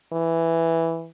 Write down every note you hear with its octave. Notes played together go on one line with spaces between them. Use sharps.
E3